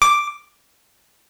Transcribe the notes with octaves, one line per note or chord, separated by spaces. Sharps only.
D6